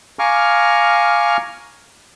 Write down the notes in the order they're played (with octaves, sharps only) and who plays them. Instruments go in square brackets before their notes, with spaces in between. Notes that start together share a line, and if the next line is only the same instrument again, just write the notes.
[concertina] F5 G#5 A#5 C#6 D6 F6